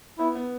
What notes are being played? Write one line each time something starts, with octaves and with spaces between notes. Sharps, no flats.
B3 E4
B3